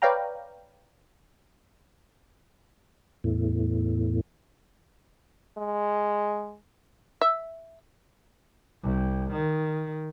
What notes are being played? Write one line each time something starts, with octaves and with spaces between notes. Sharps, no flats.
B4 C#5 D5 F5 G5 A#5
E2 A2
G#3
E5
C2
D#3